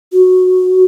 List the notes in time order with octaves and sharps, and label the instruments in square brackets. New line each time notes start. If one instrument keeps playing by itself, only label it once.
[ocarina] F#4